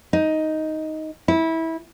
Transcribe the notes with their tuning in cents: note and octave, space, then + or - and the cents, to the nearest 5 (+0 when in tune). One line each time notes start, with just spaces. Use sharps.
D#4 +5
E4 -20